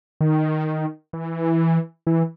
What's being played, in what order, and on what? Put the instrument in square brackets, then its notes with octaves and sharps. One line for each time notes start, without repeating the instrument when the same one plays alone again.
[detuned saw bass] D#3
E3
E3